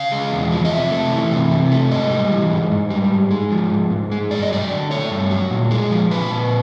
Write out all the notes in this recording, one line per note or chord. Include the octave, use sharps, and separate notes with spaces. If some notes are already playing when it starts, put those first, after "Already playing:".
Already playing: C#3 F5
G#3
E2
F3
D#5
C3 E5
A3
E3
C3
C3
A3
G#2 D#5
G3
E3
G#2
G#2
G3
G#2
G#3
F3
G#2
G#2
G#3
G2 D5
D#5
F#3 D5
D3
A3 C#5
G2
F#3
A#2
G#3
F3
A#2 B4
A#2